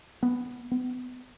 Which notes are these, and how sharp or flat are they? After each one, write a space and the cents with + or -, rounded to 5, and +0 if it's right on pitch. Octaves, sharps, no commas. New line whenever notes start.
B3 +0
B3 +30